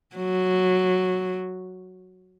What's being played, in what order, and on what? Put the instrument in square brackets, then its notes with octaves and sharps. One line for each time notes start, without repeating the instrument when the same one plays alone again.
[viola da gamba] F#3